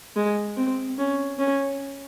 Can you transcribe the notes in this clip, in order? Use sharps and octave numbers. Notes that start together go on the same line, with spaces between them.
G#3
C4
C#4
C#4